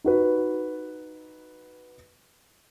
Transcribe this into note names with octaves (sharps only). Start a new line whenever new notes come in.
D#4 F#4 B4